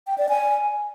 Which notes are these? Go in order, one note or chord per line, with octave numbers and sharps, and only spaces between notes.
G5
D5
G#5